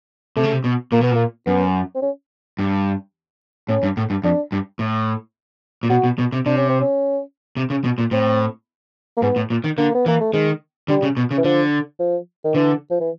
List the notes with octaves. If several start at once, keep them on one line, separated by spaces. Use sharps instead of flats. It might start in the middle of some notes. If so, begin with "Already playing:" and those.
C3 A3
C#3
C3
B2
A#2 A#3
B2 B3
A#2 A#3
F#2 B3
C4
C#4
G2
A2 C#4
G2
A2
G2
F2 D4
G2
A2
A#2
B2 F#4
B2
B2
C3
C3 D4
C#4
C4
C#4
C3
C#3
B2
A#2
A2 C4
A#3
G#2 B3
A2
A#2
D#3
D3 A#3
B3
E3 A#3
A3
D#3 G#3
D3 G3
C#3
B2
C#3
E3
D3 F3
F3
D#3
D3 E3
F3
E3